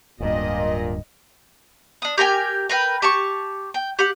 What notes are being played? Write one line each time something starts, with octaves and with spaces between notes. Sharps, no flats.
D1 G2 A#2 D#5
D4 D#6
G4 A#4 G5 G#5
A#4 B4 G5
G4 A5 C#6
G5
G4 F#5